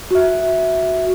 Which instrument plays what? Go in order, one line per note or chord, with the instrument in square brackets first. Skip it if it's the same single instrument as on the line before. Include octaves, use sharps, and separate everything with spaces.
[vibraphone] F#4 E5